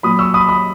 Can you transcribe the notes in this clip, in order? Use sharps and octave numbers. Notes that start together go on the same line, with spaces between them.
A#2 F#3 B5 D#6
C#6 E6
B5 D#6
B5 D#6